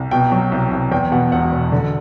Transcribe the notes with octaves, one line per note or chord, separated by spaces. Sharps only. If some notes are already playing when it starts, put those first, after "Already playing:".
Already playing: C2
B2 G5
F#3
C2
C2
E2 G5
B2 F#5
E1 F#5
E1
D3